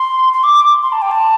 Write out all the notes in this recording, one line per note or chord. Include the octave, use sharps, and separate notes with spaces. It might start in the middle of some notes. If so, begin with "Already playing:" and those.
Already playing: C6
C6
D6
C6
A5
G5
A5